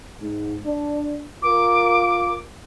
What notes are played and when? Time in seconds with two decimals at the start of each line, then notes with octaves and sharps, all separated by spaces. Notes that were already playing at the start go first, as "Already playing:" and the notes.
0.20 G#2
0.65 D4
1.42 F4 A#4 D6